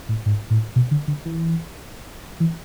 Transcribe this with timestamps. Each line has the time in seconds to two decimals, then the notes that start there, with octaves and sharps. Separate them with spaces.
0.09 A2
0.26 G#2
0.50 A2
0.76 B2
0.91 D3
1.08 D3
1.25 E3
2.40 E3